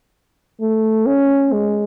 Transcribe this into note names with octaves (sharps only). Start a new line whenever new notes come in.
A3
C#4
G#3